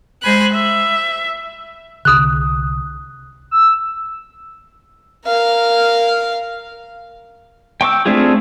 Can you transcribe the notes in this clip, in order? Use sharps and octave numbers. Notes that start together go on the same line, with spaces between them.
G#3 C5 G#5 B5 F#6
E5
C2 D3 D#6 F#6
E6
A#4 F5
G5 C#6 D6 E6
A3 C4 D4 F4 G#4